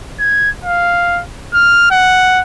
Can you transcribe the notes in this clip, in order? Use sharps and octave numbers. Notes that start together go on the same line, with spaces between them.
G#6
F5
F6
F#5